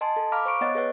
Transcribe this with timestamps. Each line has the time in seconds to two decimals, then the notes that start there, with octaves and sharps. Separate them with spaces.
0.01 D#5 G#5 A5 C6
0.16 A4
0.32 F5 A#5 B5 D6 F6
0.46 C5 C#6 D7
0.61 B3 C#5 D#5 F#5 A6
0.75 G#4 B4 C#5 F#5